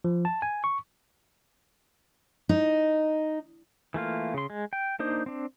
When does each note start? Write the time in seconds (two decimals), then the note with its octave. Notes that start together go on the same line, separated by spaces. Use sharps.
0.04 F3
0.25 A5
0.42 G#5
0.64 C#6
2.49 D#4
3.94 E3 A3 A#3 F4
4.34 C#3 C6
4.50 G#3
4.73 G5
4.99 A#3 D4 D#4 C5
5.26 C4 D4